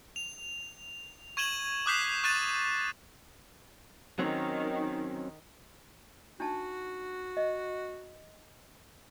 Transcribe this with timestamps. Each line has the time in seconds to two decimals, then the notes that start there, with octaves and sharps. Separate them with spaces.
0.16 F7
1.37 C#6 G#6 D#7 E7 F#7 G7
1.86 D6 D#6 F#6 G6 B6 C7
2.24 C#6 F#6 A6 D#7 E7
4.19 D#3 F#3 C4 C#4
6.40 D4 D#4 F#4 A5
7.37 D#5